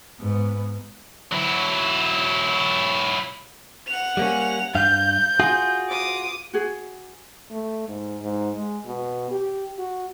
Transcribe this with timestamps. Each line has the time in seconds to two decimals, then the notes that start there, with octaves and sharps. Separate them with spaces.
0.20 G#2 B3
1.33 F#3 E4
3.87 F#5 F7
4.17 G3 A#3 C#4
4.75 G2 F5 G6
5.40 F4 F#4 G#4
5.89 D6 D#6
6.54 F#4 G#4
7.50 A3
7.88 G#2
8.21 G#2
8.55 G#3
8.85 B2
9.30 G4
9.78 F#4